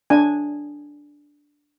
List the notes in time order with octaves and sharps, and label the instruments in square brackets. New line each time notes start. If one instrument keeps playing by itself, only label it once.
[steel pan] D4 G#5